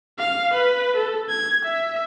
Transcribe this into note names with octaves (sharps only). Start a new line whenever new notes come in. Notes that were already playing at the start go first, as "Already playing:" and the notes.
F5
B4
A4
G#6
E5